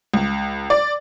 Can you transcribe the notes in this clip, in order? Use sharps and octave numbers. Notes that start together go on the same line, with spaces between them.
C#2
D5